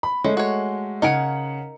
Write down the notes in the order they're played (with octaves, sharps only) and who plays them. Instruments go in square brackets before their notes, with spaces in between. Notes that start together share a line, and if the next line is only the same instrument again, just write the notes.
[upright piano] B5
[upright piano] G#3 A3 [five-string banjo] C#4
[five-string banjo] F#4 C#5
[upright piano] C#3 F#5 C#7 [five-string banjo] D#4 A#4 G#5